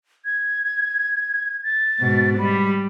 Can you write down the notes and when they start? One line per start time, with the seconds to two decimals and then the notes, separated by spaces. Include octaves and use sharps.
0.25 G#6
1.63 A6
2.00 G#2 B2
2.38 G3 B5